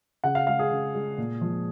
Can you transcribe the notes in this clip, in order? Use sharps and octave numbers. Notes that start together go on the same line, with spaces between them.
C#3 F#5
F5
G#3 F5
G#4
C#3
G#3
A#2
F3 G#3